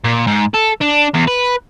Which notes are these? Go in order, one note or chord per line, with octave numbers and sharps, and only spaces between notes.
A#2
G#2
A4
D4
E2
B4